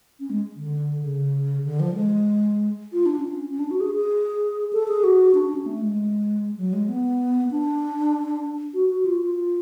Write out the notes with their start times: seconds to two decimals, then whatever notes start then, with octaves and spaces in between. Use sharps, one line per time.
0.20 C#4
0.30 G#3
0.56 D3
1.03 C#3
1.64 D3
1.80 F3
1.95 G#3
2.93 F4
3.06 D4
3.19 C#4
3.50 C#4
3.59 D4
3.71 F#4
3.80 G#4
3.95 G#4
4.73 A4
4.88 G#4
5.04 F#4
5.34 D4
5.45 D4
5.55 C#4
5.66 A3
5.81 G#3
6.58 F#3
6.73 G#3
6.89 B3
7.51 D4
8.74 F#4
8.89 F#4
9.05 F4
9.21 F4